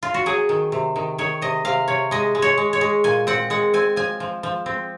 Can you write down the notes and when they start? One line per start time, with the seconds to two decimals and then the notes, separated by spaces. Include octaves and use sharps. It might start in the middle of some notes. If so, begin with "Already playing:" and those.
0.03 F4
0.14 F#4
0.26 F#3 G#4
0.49 D#3
0.72 C3
0.96 D#3
1.18 D#3 C#5
1.42 C3 D#5
1.65 C3 F5
1.88 C3 C#5
2.11 G#3 D#5
2.35 G#3
2.42 C#5
2.58 G#3
2.73 C#5
2.81 G#3
3.04 A#2 G#5
3.27 C4 F#5
3.50 G#3 F#5
3.74 C4 G#5
3.96 F3 G#5
4.20 F3
4.43 F3
4.66 C4